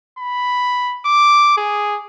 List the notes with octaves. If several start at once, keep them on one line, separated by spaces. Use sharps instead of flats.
B5
D6
G#4